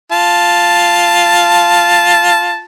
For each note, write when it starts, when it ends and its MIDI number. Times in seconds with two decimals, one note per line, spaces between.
0.12 2.65 65
0.12 2.65 81